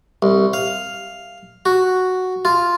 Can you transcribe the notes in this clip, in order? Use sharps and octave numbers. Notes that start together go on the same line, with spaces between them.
C2
F5
F#4
F4